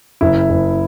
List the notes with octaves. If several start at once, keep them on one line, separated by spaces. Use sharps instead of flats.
F#1 E4
F#1